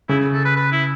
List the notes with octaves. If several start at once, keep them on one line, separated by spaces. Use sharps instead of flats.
C#3 E4
A4
B4
B4
E4